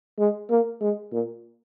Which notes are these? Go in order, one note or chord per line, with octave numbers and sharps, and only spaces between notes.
G#3
A#3
G#3
A#2